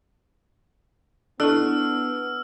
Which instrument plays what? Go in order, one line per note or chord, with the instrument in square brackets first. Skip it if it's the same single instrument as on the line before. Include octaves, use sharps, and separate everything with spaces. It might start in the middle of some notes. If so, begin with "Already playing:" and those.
[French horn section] B3 [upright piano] D4 [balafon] E4 A4 [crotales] E6 F6